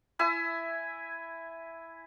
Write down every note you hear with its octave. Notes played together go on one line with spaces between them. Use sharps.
E4 E5 G#5 E6